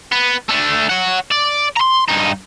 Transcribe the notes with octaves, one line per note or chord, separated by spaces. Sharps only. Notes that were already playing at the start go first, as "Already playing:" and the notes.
B3
A3 D4
C#5 F#5
D5
A#5 C6
G2 D#4